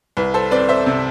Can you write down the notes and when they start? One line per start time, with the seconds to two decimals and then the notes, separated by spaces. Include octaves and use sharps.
0.17 C2 B4
0.34 A4 C5
0.51 C4 B4 D5
0.69 C5 E5
0.86 C3